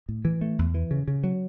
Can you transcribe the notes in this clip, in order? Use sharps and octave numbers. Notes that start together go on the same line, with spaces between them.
A2
E3
A3
E2
E3
C#3
C#3
F#3